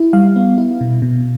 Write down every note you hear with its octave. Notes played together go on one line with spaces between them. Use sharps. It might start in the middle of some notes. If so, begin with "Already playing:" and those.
Already playing: E4
G3 F5
B3
E4
B2
B2